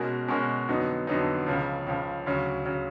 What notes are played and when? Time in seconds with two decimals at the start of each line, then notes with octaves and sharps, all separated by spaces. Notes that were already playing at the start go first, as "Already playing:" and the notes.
Already playing: B2 G#3 C#4 F#4 A#4
0.28 B2 G#3 C#4 F#4 A#4
0.68 F2 D3 F#3 B3 D#4
1.07 F2 D3 F#3 B3 D#4
1.47 C#2 C#3 F3
1.87 C#2 C#3 F3
2.26 D2 C#3 F#3
2.66 C#3 F#3